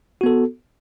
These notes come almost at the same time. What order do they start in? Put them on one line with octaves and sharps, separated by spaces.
F#4 B3 A4